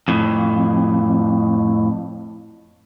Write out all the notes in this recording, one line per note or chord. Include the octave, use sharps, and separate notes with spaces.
F2 A2